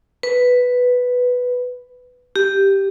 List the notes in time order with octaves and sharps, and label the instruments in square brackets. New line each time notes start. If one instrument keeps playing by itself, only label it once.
[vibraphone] B4
G4